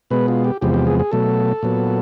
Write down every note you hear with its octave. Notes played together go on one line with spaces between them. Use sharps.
B2 G#3 B3 B4
F4
G4
E2 C3 F3 G#3 B3 G4
G4
G#4
G#4
B2 F#3 A3 A4
A#2 F#3 B3